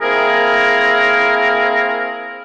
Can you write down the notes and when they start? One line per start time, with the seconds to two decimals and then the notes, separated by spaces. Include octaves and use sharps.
0.02 A#3 C4 E4 G#4 A#4